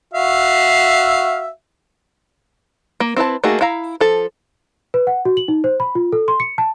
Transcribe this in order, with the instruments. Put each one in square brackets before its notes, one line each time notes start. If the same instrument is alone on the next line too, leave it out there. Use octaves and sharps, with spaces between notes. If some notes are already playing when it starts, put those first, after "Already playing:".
[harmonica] F#4 E5 F5
[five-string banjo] A#3
C4 E4 B4 A5
A3 A#3 D#4 F#4 G#4
E4 F5 A#5
F3 A4
[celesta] B4
F#5
F#4
F#7
D#4
C5
B5
F4
A4
C6
C#7
A5